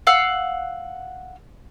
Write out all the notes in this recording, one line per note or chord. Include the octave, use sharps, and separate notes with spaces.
F5 F#5 E6